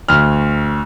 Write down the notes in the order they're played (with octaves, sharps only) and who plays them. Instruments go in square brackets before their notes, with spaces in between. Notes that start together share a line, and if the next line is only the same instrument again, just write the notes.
[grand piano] D2 F6